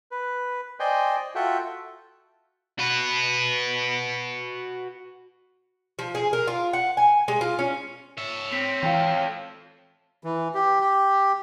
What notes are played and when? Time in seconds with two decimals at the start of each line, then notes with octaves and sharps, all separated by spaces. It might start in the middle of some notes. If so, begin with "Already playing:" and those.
0.11 B4
0.80 C5 D5 D#5 G5 G#5 C6
1.35 F4 F#4 A4 E5 F#5 G5
2.79 F#4 B4
5.99 F3
6.15 G#4
6.33 A#4
6.47 F4
6.73 F#5
6.97 G#5
7.28 G#3
7.41 F4
7.59 C#4
8.18 C#5 E5
8.53 C4 B6
8.83 E3 C4 A4 F5 G5
10.23 E3
10.55 G4
10.80 G4